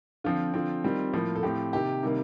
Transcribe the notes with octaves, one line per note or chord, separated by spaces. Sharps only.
D3 F3 C4 F4
D3 F3 C4
D#3 G3 C4
A2 F3 A#3
A4
A2 F3 C4 G4
C3 D#3 A#3 G4
C3 D#3 G3 A#3